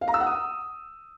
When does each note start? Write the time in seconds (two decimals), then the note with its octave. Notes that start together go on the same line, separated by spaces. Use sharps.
0.01 F5
0.08 A#5
0.14 E6
0.20 F#5
0.26 D#6